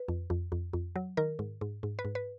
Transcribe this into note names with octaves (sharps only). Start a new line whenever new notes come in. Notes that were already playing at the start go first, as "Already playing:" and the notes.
Already playing: B4
F2
F2
F2
F2
F#3
D#3 A#4
G#2
G#2
G#2
B4
G#2
B4